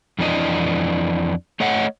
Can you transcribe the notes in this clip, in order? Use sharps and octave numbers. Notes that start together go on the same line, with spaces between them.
F2 E3 D4 D#5
A3 C#5 D#5 F#5